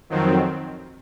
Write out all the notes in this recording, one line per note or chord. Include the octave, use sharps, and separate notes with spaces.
F2 D#3 F#3 C4